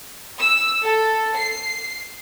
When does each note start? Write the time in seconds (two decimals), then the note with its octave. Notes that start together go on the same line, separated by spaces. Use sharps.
0.39 E6
0.84 A4
1.36 C7